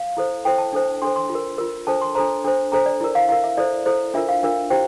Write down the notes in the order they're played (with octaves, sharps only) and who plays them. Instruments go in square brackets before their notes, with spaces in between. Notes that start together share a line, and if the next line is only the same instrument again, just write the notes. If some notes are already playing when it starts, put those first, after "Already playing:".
Already playing: [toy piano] F5
E4 A4 C5
E4 A4 C5 G5
A5
D4 A4 C5
D4 A4 C5 C6
C6
F4
A#4
F4 A#4
D4 A4 C5 A5
C6
D4 A4 C5 A#5
D4 A4 C5
D4 A4 C5 A#5
D5
E4 A#4
F5
E4 A#4 F5
E5
E4 A4 C5 D5
E4 A4 C5
D4 F4 A#4 E5
F5
D4 F4 A#4
E4 G4 C5 G5